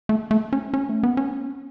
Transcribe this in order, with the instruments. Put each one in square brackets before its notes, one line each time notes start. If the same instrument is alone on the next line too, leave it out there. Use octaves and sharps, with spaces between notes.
[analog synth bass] A3
A3
C#4
C#4
A3
B3
C#4